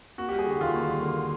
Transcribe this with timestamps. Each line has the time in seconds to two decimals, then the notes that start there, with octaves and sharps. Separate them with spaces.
0.18 A#3 F#4
0.29 G3 G4
0.39 G#4
0.47 D3 F#4
0.61 D#2 F4
0.74 A#3
0.88 G3
1.02 D3